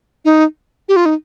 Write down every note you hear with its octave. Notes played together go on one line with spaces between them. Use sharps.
D#4
G4
F4
D#4